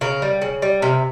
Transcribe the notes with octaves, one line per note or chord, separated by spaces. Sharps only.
C#3 A#4
G3
C#3
G3
C3 A#4